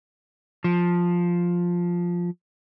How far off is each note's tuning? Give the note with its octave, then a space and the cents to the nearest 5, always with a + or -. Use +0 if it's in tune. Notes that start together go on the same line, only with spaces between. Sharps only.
F3 +5